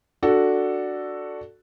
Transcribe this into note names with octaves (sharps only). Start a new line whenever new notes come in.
D4 F#4 A4